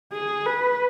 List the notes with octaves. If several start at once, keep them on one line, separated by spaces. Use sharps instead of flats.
G#4
B4